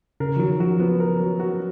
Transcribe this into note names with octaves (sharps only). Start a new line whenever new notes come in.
C#3 A#4
F3
D#3 F#3
F3 F#4
F3 B3
A#4
F#3
F#4